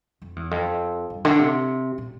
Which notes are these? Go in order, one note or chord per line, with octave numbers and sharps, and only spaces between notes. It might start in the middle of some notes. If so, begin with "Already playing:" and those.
F2
E2
F2
G2
D3
C3
A#2